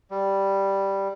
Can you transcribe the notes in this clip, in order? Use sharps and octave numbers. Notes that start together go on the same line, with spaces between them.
G3